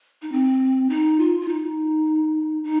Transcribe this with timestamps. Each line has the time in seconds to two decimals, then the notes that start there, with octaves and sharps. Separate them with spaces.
0.22 D#4
0.32 C4
0.90 D#4
1.19 F4
1.41 F4
1.48 D#4
2.64 D#4